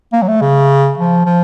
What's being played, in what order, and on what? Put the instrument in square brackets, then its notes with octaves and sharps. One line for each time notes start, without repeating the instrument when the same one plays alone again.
[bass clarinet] A#3
F#3
A3
C#3
F3
F3